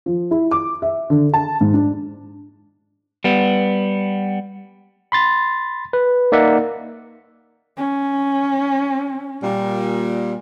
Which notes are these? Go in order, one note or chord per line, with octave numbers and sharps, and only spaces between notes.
F3
E4
D6
E5
D3
A5
G#2
D4
G3 B3
B5 C6 A6
B4
A#3 D#4 D5 E5 F#5
C#4
A#2 G3